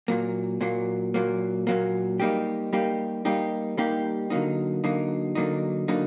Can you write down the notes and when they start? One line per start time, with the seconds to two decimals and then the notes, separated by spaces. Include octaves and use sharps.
0.08 A#2 F#3 A#3
0.61 A#2 F#3 A#3
1.14 A#2 F#3 A#3
1.67 A#2 F#3 A#3
2.20 G3 A#3 D#4 G4
2.73 G3 A#3 D#4 G4
3.25 G3 A#3 D#4 G4
3.77 G3 A#3 D#4 G4
4.30 D3 F#3 A#3 D#4
4.84 D3 F#3 A#3 D#4
5.35 D3 F#3 A#3 D#4
5.88 D3 F#3 A#3 D#4